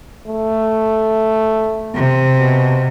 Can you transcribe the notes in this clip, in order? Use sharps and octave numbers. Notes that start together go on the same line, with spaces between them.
A3
C3
B2